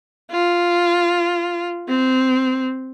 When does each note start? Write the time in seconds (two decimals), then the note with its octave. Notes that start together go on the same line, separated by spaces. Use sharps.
0.31 F4
1.89 C4